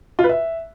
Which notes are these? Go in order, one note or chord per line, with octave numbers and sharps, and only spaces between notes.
F4
B4
E5